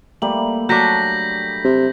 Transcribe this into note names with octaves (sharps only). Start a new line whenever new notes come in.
G3 A3 A#3 F#7
F#3 D4 A5 C#6 G6 A#6 B6
C3